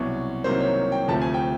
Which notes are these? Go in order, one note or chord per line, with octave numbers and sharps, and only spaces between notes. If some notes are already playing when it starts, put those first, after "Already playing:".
Already playing: C2 B2 F#3 B3
C2 C3 D#3 F#3 A#3 C5
C#5
G5
D2 C3 F3 A3 A5
G#5
G5